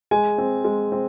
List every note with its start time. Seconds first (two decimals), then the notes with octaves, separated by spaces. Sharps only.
0.11 G#3 G#5
0.38 C4
0.64 G#3
0.92 C4